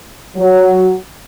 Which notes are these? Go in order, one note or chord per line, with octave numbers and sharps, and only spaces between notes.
F#3